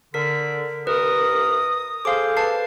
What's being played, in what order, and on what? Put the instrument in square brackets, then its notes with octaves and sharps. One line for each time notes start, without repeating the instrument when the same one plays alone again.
[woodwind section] D3 [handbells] A#4 B6
[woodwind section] C2 A#4 [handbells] B4 [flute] D#6
[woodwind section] G#4 A4 C5 [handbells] F5 D6
[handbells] B4 A5 C7